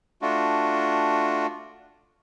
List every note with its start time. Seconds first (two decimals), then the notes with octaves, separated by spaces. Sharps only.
0.22 A3 D4 F4 F#4